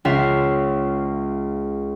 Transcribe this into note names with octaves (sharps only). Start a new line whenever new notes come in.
C#2 F4 E5 F5